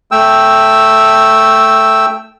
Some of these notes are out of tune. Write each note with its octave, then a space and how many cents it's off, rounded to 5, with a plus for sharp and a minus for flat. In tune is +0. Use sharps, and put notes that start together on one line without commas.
A3 +0 G5 +0 E6 -5